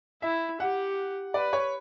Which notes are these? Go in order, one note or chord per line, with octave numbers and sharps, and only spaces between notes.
E4 E5
G4 F#5
B4 D5
C#5